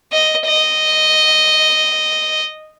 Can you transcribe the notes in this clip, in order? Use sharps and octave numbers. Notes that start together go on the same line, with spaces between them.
D#5
D#5